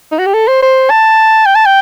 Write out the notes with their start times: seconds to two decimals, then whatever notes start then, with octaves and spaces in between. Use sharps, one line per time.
0.12 D#4
0.19 F#4
0.26 G4
0.34 A4
0.48 C5
0.62 C5
0.90 A5
1.46 G5
1.55 A5
1.66 G5